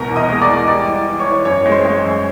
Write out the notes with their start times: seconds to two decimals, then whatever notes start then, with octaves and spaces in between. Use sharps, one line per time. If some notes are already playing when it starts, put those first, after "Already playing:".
Already playing: C2 B2 A#4 A#5
0.10 E2
0.16 D#5 D#6
0.29 G#3
0.41 D5 D6
0.48 E2
0.67 G3 D5 D6
0.88 E3
1.07 E3
1.20 C#5 C#6
1.26 E3
1.45 F#2 C#5 C#6
1.66 G#3
1.71 C5 C6
1.85 G#3
2.05 F#2